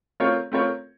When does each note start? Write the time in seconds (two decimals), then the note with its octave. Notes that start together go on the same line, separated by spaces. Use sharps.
0.20 A3 C4 F4 A#4 C#5
0.52 A3 C4 F4 A#4 C#5